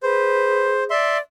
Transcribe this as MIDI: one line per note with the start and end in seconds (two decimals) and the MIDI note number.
0.03 0.89 68
0.03 0.72 71
0.03 0.84 72
0.90 1.19 74
0.90 1.18 76
0.90 1.18 84